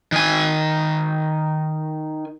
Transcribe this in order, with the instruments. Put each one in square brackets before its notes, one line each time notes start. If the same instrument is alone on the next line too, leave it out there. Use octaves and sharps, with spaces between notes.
[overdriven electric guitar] D#3 G#5